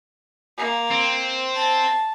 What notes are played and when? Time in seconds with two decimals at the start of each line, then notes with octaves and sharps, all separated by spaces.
0.57 A#3
0.91 C4
1.55 A5